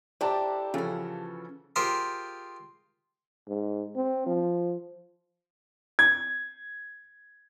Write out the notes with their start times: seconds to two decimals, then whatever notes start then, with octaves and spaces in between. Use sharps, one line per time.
0.21 D4 E4 G4 A4 C5 A5 A#5 D6
0.74 C#3 E3 F3 F#4 A4
1.76 F4 G4 G#4 A#4 C5
3.48 G#2
3.96 C4
4.26 F3
5.99 G#6